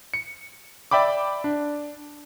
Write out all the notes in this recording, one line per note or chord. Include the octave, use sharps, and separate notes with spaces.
C#7
D5 E5 G5 B5 D6
D4